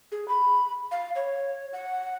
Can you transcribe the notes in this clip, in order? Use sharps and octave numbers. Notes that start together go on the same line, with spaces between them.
G#4
B5
F5
C#5
F#5